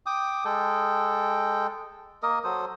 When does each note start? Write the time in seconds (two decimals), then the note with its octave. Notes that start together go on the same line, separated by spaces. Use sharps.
0.06 G5 D6 D#6
0.45 G#3 A4 G5
2.23 A#3 A#4 D#5 D#6
2.44 F#3 A4 C5 D#6